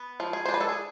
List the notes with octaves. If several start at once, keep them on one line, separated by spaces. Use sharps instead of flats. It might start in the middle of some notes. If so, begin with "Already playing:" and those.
Already playing: B3
F3
G#4
C5
D4
B4
A4
G#4